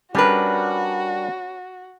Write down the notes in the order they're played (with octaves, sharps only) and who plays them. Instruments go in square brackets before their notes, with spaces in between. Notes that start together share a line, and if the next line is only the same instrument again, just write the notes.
[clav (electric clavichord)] G3 D4 A#4 [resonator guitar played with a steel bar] C#4 B4 [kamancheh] F#4